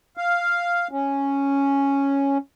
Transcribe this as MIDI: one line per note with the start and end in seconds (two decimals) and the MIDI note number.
0.17 0.88 77
0.91 2.38 61